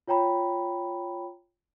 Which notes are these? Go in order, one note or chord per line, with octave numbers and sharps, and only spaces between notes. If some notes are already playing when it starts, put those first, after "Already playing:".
F4 C#5 G5 A#5 B5